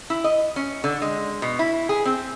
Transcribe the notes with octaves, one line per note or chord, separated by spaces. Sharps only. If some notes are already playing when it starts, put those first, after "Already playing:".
E4
D#5
C#4
D3
G#3
B2
E4
G#4
C4